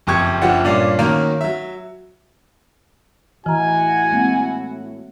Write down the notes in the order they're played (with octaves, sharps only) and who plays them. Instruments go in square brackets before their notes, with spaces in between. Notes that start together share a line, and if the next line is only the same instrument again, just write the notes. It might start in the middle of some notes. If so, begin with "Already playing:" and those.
[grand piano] F#1 F2 G4 C#6 G#6
F#1 F3 D4 G4 D5 F#5
G2 A#2 C#4 D5 F5
D#3 F#3 A#3 C#4 A#4
F#3 E5
[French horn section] A2 E4 F#4 [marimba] E3 A#5 [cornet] G#5
[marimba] G#3 A#3 C4